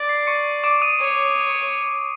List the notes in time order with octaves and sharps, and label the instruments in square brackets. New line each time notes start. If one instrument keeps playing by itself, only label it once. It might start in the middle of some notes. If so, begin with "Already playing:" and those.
Already playing: [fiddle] D5
[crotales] C7
C#6 C#7
D6 D7
D#6 D#7
[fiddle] C#5